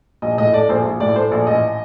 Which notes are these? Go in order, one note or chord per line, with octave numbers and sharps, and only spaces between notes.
A#1 D#5
A2 D#5
A3 D5
A#1 C5
A#1
A2 D5
A3 C5
A#1 D5
A1 D#5